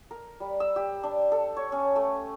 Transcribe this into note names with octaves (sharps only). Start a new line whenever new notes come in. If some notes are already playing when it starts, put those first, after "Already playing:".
A#4
G3
E6
G4
D4
A4
C#5
C#4
A3